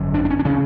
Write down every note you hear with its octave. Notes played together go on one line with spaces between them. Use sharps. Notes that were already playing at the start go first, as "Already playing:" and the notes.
Already playing: G#1 F#2 D3
D4
D4
C#4
D4
C#3 C#4